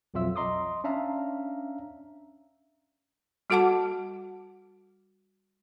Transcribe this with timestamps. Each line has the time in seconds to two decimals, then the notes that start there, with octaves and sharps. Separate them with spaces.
0.14 B1 F2 F#3 F4 E5 E6
0.36 D#5 A#5 C6 D6 D#6
0.84 C#4 D4 E5 F5 A#5
3.50 G3 F#4 A4 F#5 A5 D6